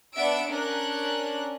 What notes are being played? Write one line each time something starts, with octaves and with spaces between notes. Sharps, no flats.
B3 D4 E5 F#5 E6 D7
C#4 D4 A#4 F#6